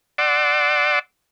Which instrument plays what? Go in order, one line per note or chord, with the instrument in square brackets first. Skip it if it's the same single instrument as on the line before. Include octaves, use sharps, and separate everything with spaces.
[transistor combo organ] D5 F#5 C6 D6 E6